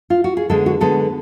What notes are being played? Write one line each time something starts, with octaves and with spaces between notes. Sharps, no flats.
F4
F#4
G#4
D3 G#3 B3 A4
F#4
D3 G#3 B3 A4